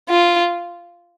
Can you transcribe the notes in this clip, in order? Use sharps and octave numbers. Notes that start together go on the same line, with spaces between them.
F4